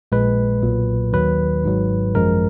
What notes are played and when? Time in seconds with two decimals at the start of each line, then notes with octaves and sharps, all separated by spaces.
0.12 A#1 A#2 G#3 B4
0.62 B1 A#2 F#3
1.13 D#2 D#3 F#3 B4
1.64 G#1 G#2 F#3
2.14 G#1 F#2 F3 G#3 A#4